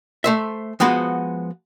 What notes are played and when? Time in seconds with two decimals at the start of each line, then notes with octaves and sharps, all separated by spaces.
0.24 A3 C5 E5
0.80 F3 G#3 B3 F#4 B4 C5